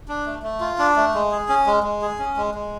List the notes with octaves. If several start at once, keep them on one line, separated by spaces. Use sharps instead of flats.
D4
A3
A3
F4
D4
A3
G#3
G#4
C#4
G#3
G#3
G#4
C#4
G#3
G#3